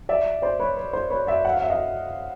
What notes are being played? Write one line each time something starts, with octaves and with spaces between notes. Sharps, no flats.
D5 E5
C5 D5
B4 C#5
B4
C5
B4 C#5
D5 E5
F#5
F5
E5
D#5 F5